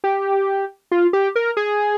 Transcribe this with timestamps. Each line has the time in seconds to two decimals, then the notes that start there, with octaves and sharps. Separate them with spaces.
0.04 G4
0.91 F4
1.13 G4
1.36 A#4
1.57 G#4